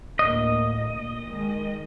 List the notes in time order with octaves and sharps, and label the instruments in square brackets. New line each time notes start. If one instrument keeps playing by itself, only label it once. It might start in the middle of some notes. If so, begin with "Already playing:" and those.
[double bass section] D2 A2 A#3 [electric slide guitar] D#5
[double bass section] A#2
D#3 G#3